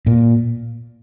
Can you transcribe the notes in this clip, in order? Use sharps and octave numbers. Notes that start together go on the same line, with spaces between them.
A#2